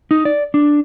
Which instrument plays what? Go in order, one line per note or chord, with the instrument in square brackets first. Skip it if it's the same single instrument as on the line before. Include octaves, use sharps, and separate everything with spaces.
[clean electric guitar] D#4
D5
D4